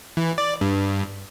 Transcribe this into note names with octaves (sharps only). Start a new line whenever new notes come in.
E3
D5
G2